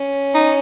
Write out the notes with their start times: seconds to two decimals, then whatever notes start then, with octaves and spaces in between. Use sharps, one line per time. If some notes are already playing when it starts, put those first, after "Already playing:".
Already playing: C#4
0.34 D#4